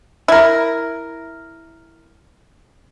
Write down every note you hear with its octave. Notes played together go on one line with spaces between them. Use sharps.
E4 A#4